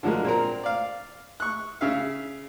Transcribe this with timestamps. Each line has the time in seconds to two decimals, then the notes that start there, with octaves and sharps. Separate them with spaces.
0.03 D3 F3 F#3 G#3 A#3
0.24 A#2 C4 A#4
0.63 D5 F5
1.40 C#6 F#6
1.81 C#3 E5 F5